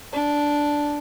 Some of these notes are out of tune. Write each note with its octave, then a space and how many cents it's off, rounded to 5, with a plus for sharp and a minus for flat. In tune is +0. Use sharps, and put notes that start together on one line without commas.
D4 -5